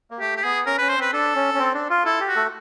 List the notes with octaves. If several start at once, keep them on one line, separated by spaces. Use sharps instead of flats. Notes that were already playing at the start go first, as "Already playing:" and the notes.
A#3
A3 G4
G4
B3 G#4
C#4 A#4
B4
C#4
C5
C4 B4
D4 A4
C#4
C#4
C4
D4
F4
E4 A4
G4
F#4
A3 A4